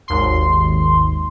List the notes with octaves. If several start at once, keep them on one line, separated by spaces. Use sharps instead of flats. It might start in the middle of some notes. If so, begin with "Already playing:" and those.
G#1 D#2 C6